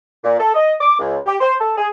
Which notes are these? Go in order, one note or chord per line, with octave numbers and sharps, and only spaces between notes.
A#2
A4
D#5
D6
C#2
G4
C5
A4
G#4